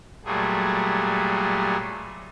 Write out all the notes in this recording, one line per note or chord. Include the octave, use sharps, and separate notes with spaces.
A#2 F#3 G3 A3 G#4